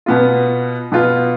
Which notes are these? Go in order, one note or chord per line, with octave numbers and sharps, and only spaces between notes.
B2 B3 F4
B2 B3 F4